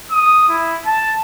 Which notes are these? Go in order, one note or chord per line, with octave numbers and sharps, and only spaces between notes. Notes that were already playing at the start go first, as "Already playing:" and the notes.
D#6
E4
A5